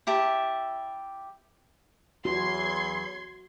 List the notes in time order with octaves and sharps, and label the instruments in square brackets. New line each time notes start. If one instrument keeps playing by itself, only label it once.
[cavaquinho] E4 G4 E5 A5
[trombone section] E2 F#3 [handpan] F#4 [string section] C6 G#6